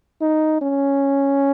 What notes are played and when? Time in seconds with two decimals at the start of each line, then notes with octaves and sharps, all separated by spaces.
0.21 D#4
0.61 C#4